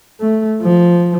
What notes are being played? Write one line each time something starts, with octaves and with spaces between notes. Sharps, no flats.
A3
F3